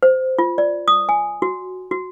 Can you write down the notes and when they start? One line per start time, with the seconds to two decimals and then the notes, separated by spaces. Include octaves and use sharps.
0.03 C5
0.39 F4
0.58 D5
0.88 D#6
1.09 G#5
1.42 F#4
1.91 F#4